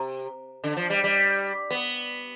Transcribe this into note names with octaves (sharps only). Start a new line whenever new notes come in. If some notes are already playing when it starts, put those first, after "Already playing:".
Already playing: C3
D3
F3
G3
G3
B3